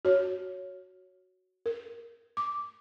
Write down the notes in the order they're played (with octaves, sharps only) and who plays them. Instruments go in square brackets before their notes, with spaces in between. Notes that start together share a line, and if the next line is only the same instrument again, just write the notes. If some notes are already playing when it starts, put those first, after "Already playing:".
[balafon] F#4 C#5
A#4
D6